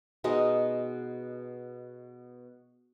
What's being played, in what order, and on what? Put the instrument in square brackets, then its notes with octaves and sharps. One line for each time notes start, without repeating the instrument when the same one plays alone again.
[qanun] B2 G#3 D#4 D#5